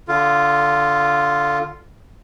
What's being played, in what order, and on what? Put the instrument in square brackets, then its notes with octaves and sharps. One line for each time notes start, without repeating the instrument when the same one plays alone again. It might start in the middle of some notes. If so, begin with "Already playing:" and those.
[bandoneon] D3 F4